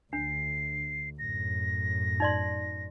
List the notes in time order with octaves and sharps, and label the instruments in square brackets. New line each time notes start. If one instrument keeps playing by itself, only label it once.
[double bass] D2 [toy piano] D4 [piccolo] C7
[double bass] F#2 A2 [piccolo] A#6
[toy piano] D#4 D5 C6